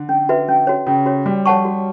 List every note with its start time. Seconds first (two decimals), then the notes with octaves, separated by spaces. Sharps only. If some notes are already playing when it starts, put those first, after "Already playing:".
Already playing: D3
0.09 C#4
0.29 F#4 B4 E5
0.48 C#4
0.67 F#4 C#5
0.87 C#3 C#4
1.06 F#4 C#5
1.26 G3 F#4
1.46 C#5 F#5 A5 C#6
1.65 F#4